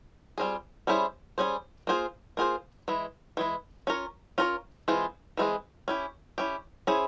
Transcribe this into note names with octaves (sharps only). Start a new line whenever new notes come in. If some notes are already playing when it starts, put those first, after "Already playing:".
G3 C4 F4 G#4
G3 C#4 E4 G#4 C5
G3 C#4 E4 G#4 C5
A#3 F4 G#4 C5
A#3 F4 G#4 C5
E3 G#3 E4
E3 G#3 E4
C#4 F4 A#4 C#5
C#4 F4 A#4 C#5
E3 G#3 C4 F4 G#4
E3 G#3 C4 F4 G#4
C#4 E4 G4
C#4 E4 G4
C#4 E4 G#4 C5